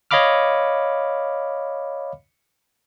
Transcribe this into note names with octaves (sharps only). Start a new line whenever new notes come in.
C#5 D#5 F5 B5 D6 F6